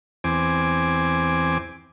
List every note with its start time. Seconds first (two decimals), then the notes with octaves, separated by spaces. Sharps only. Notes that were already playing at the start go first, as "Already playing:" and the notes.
0.24 E2 C4 G#5 D6